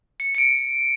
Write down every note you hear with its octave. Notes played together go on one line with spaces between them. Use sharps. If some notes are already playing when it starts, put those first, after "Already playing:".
C#7
C#7 D7